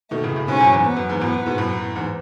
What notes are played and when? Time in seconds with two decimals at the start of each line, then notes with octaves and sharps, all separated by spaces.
0.11 B2 D#3 A3
0.23 A2 C#3
0.36 A2 C#3
0.48 G#2 B2 C#4
0.60 F#2 A2
0.73 E2 G#2
0.85 B3
0.97 F#2
1.09 E2 G#2
1.21 F#2 A2 B3
1.46 G#2 B2
1.58 F#2 A2
1.95 E2 G#2